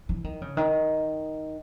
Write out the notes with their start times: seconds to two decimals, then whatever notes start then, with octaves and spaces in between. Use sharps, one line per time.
0.09 E3
0.24 D#3
0.42 C#3
0.57 D#3